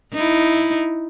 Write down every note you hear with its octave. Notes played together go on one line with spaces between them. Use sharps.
D#4 E4